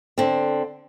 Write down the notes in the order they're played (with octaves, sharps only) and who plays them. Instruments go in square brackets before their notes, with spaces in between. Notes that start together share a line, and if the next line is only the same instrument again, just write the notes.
[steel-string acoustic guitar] D3 C4